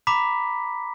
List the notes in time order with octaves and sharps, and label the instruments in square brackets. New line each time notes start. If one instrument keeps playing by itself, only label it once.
[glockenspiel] A#5 B5 D6 B6